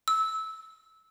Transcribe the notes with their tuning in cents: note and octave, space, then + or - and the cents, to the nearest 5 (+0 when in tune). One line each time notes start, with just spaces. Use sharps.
E6 -20